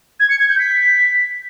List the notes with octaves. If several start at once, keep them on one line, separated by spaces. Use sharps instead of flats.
G#6
C#7
G#6
G6
B6